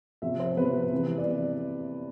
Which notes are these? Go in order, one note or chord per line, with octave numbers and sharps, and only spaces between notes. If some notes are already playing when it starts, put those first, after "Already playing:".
C3 F3 E5
C5
C3 F3 B4
C3 E3
D5
C3